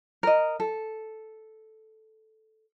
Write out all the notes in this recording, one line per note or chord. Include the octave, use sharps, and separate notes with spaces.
A#4 D#5
A4